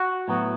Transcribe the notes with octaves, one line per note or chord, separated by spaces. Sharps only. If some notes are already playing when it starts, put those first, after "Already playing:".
Already playing: F#4
A2 F#3 B3